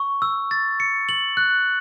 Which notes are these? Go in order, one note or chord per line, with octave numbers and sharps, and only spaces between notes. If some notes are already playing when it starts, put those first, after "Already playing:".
Already playing: C#6
E6
A6
C#7
F#7
F#6